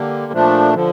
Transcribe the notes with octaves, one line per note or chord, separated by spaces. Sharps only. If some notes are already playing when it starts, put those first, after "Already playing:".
Already playing: D3 G3 A#3
A#2 F3 A3 D4
D3 F3